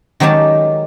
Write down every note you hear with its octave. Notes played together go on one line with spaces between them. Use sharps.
D#3 F#3 G#3 G4 C#5 A5